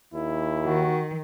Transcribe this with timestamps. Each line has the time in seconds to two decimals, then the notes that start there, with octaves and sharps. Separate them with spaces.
0.14 D#2 E4
0.65 D#3 F#4